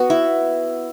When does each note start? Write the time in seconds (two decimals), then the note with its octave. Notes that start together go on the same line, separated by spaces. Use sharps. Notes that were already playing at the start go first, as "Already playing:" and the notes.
Already playing: B3 F#4
0.10 E4